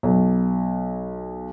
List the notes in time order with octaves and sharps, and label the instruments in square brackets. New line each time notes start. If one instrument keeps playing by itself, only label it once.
[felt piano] B1